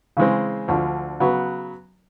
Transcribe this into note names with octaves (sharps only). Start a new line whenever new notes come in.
C#3 E3 G#3 C4
D2 D3 F3
C#3 F#3 B3